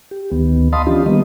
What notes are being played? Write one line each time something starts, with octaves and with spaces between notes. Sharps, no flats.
G4
D2 D#3 B3
D#5 F5 A5 B5 C6 D#6
E3 C#4 D4 F4 G4
D#3 G3 A#3 B3 D#5